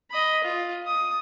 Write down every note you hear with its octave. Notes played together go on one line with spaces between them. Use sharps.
D#5 B5
F4
D#6